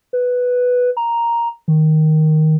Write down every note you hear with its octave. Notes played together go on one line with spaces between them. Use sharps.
B4
A#5
D#3